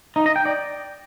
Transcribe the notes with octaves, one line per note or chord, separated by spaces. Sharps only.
D#4
D#5
G5
D5